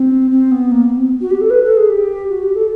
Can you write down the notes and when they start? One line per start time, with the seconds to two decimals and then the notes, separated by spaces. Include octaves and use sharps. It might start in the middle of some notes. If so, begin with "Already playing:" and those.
Already playing: C4
0.31 C4
0.51 B3
0.72 A#3
0.85 B3
0.97 C4
1.21 F#4
1.30 G4
1.41 A4
1.50 B4
1.64 A4
1.77 G#4
1.89 G4
2.29 F#4
2.43 G4
2.56 A4